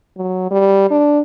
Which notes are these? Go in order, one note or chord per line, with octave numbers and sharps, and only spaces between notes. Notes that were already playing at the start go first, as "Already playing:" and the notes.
F#3
G3
D4